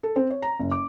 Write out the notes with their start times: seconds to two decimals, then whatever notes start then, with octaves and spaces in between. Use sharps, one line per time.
0.03 A4
0.16 C4
0.30 C#5
0.42 A#5
0.60 F#1
0.71 D6